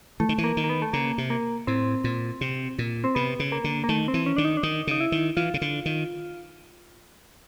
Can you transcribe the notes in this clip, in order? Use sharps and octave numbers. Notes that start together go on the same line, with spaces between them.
E3 A3
D#3
E3
A#3
D#3
A#3
B3
A3
C#3 A#3
C3
A#3
A2 C4
A#2
C3
A#2
C4
C3 B3
C#3
A#3
D3
A#3
D#3 A3
C4
E3
C#4
D#3 D4
D#4
D4
D#3 D#4
C#3 D#4
E4
D#3
E3 F4
C#3
D3
D#3